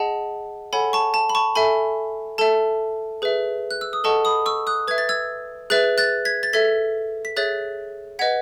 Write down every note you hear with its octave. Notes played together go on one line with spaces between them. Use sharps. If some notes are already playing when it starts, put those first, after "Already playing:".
Already playing: G#4 D#5 F#5 A5
A4 C#5 F#5 G#5 B5
A5 C#6
A5
B5
A5 C#6
A4 E5 G#5 B5
A4 E5 A5
G#4 B4 E5
F#6
E6
D#6
A4 D#5 F#5 A5 C#6
B5 D#6
C#6 E6
D#6 F#6
B4 E5 G#6
A6
E6 G#6
G#4 B4 E5 F#6 A6
F#6 A6
G#6 B6
A6
A4 E5 G#6 B6
B6
G#4 C#5 E5 F#6 A6
B4 D#5 F#5 G#6 B6